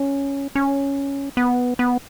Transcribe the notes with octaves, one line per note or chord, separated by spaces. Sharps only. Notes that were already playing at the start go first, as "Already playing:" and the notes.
Already playing: C#4
C#4
B3
B3